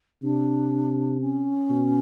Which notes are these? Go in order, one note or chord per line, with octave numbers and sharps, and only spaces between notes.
C3 D4
C#4
B2